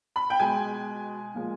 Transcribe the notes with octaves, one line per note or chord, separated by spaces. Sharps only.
B5
G5
B2 G#3 G#5
A#2 F3 G#3